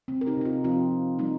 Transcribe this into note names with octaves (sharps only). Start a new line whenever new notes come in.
C3 C4
A#4
D#4 G4
C3 D#4
C4 F4
F3 C4 F4
C3
G3 A#3 D#4